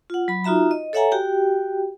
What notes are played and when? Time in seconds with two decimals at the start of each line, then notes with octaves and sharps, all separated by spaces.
0.10 F4 F#5
0.28 F#3 B5
0.44 D#4 F4 F#4 E5 A#5
0.71 D#5
0.93 A4 C#5 E5 F#5 G#5 A#5
1.12 F#4 G4 G5